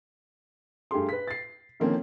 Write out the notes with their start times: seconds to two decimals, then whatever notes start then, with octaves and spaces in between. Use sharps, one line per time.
0.91 G2 A3 G4 G#4 C6
1.09 B4 B6
1.28 A6 C7
1.80 D3 D#3 F3 A#3 C4 C#4